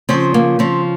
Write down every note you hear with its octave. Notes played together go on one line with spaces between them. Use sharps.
C#3 F3 C4
A#3
C#3 F3 C4